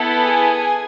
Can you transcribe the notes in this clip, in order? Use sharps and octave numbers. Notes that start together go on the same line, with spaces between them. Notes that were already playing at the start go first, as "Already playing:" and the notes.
Already playing: B3 E4 A4
G#4 G#5